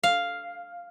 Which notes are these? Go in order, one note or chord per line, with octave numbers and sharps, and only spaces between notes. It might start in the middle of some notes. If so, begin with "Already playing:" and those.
F5